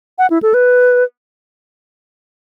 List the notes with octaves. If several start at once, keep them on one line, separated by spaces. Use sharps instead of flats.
F#5
E4
A4
B4